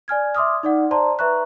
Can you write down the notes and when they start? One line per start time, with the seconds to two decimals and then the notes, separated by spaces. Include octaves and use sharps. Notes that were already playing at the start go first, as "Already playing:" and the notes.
0.08 D5 G#5 F6 G#6
0.35 E5 C6 D6 D#6 F6
0.63 D#4 D5 F#5
0.91 C5 D5 A5 A#5 C6
1.19 B4 E5 A#5 C#6 F#6